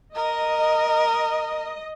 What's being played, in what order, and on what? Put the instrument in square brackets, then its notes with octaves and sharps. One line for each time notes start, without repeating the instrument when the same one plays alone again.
[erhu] A#4 [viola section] D#5